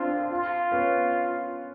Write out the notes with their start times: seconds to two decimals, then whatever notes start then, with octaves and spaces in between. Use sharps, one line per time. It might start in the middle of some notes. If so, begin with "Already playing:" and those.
Already playing: C4 D4 F4
0.31 F4
0.72 B3 C#4